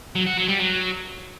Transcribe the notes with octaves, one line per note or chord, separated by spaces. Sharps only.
F#3
F#4
F#3
G3
F#3